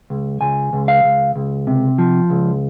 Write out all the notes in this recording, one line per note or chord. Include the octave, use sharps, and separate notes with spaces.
C#2
C#2 G#5
C#2
F5
C#2
C#2
C3
F3
C#2